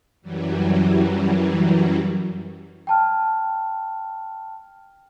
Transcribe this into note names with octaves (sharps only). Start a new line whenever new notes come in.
F#2 E3 F#3 G3
G5 A5 F6